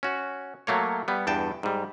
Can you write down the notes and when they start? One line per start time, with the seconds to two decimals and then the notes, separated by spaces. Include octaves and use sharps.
0.03 C#4 F#4
0.67 F#3 A3 A#3 C#5
1.08 G3 B3
1.27 E2 G2 G5 A5
1.63 G#2 G3